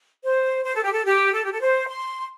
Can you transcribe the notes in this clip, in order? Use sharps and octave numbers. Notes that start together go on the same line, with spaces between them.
C5
C5
A4
G4
A4
G4
A4
G4
A4
C5
C6